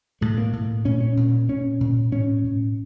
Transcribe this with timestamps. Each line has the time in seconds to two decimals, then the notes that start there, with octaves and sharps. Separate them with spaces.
0.21 A2 A3
0.38 A#3
0.53 A2
0.85 A#2 C#4
1.00 C#4
1.17 A#2
1.49 A#2 C#4
1.80 A#2
2.12 A2 C#4
2.44 A2